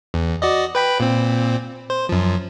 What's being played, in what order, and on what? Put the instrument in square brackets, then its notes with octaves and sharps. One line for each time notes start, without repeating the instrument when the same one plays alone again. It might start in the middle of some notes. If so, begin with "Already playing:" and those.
[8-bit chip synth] E2
F#4 D5 D#5
B4 G5 B5
A#2 C4
C5
F#2 F3